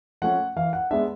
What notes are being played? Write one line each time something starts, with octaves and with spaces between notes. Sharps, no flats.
F3 A3 C#4 F#5
E3 F5
F#5
G#3 B3 D4 E5